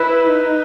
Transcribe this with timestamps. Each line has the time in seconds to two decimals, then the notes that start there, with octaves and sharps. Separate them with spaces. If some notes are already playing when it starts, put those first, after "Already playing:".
Already playing: E4 B4
0.30 D#4